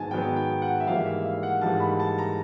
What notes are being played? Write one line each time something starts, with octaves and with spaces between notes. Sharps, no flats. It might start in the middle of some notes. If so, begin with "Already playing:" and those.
Already playing: G#2 D#3 F#3 B3 G#5 A5
G#2 D#3 F#3 B3 G5
G5
F#5
E5
G#2 E3 G3 A#3 F5
E5
F5
F#5
G#2 E3 G3 A#3 A5
B5
A5
A#5